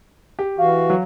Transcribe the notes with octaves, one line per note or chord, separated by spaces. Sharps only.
G4
E3 F#4 F5
F#3